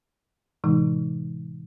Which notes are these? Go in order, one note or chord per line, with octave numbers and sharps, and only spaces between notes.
A2 C3 E3 G#3 D#4